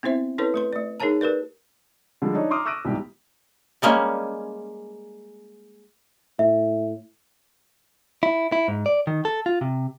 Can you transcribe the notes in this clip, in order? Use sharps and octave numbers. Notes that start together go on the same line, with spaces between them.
B3 C4 E4 C5 E5
C#4 E4 A4 B4 C#5
A3 B4 C6
A3 D5
D#4 G#4 A#4 C#5 A5 A#5
G4 A#4 B4 D5
D3 F3 G3 G#3
D4 D#4 C#5
A#5 C6 D6 D#6 F6
C#6 E6 F#6 A#6 D7 D#7
C2 G#2 B2 E3 G4
G3 G#3 A#3 C#4
A2 E5
E4
E4
G#2
D5
D#3
A4
F4
C3